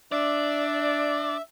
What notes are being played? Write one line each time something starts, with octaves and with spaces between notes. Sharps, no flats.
D4 D5 E5